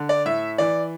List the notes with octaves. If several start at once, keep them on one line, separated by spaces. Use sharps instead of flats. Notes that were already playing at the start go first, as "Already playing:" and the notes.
Already playing: D3
D5
A2 E5
E3 D5